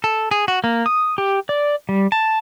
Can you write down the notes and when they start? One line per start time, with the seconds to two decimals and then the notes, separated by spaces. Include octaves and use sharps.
0.04 A4
0.31 G#4
0.48 F#4
0.64 A#3
0.86 D#6
1.18 G4
1.49 D5
1.89 G3
2.12 A5